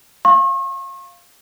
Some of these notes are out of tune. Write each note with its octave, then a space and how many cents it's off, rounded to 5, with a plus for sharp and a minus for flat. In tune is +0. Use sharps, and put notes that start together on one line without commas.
F5 +0 C#6 -40